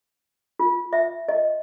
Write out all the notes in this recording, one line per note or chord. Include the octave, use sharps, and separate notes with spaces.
F4
E5
D#5